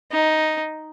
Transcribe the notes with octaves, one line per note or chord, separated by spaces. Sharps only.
D#4